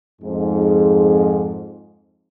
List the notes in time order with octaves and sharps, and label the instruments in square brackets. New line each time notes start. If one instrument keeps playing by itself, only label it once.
[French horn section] F2 G#2